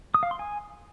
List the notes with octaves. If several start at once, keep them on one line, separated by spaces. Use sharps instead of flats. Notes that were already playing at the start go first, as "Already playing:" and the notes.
D#6
F5
C6
G#5